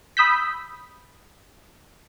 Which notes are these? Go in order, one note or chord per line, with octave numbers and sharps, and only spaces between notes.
B5 D#6 E6 G6 B6